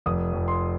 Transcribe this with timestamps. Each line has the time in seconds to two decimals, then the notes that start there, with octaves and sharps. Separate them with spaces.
0.06 F1 D#6
0.33 F2
0.48 C6